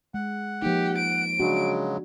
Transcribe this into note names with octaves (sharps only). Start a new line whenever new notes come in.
G#3 F#5
F3 A#3 D#4 G4
D7
C#3 F#3 G#3 D4 F#4